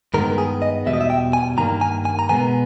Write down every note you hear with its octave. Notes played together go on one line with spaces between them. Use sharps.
G2 D#3 G#3 B3 A#4
G#4
D#5
E2 B2 G3 E5
D#5
E5
G5
G#5
G2 D#3 G3 A#3 A#5
G#5
G#5
A#5
B2 G#3 B3 G#5